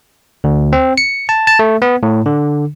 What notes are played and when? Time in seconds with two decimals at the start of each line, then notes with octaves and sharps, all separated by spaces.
0.44 D2
0.73 C4
0.98 C#7
1.29 A5
1.47 A5
1.59 A3
1.82 B3
2.03 A2
2.26 D3